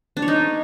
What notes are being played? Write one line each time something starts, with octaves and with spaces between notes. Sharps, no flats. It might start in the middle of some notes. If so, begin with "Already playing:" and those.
D4
C#5
D#4